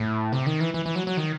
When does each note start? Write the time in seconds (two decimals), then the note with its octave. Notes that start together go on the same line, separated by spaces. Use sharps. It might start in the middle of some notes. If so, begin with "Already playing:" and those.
Already playing: A2
0.32 C3
0.46 D#3
0.60 E3
0.74 E3
0.86 E3
0.96 F#3
1.07 F#3
1.17 D#3